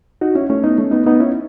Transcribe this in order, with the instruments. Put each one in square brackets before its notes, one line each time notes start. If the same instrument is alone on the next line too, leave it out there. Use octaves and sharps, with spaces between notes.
[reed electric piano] D#4 F#4
C#4 E4
A3 C#4
B3 D#4
A3 C#4
B3 D#4
B3 D#4
C#4 E4